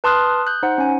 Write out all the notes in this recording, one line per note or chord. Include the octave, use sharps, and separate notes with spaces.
B4 A5 C6 D#6 F6 F#6
D#6
F#6 G6
D#4 C5 F#5
C#4 G#5